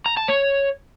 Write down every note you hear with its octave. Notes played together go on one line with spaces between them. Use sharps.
A#5
A5
C#5